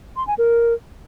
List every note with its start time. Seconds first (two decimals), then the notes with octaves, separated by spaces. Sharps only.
0.16 C6
0.27 G#5
0.38 A#4